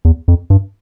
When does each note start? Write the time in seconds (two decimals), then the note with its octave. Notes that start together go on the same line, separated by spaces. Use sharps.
0.05 E2
0.28 F2
0.50 G2